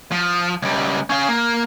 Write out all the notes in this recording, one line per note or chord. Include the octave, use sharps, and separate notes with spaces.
F3
C#2 G3
C#4 F5
A#3